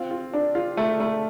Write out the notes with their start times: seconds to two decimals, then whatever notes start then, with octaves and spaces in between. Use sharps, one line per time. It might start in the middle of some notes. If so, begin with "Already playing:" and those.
Already playing: C4 F4
0.11 F4
0.33 D4
0.55 F4
0.77 A3
1.00 A3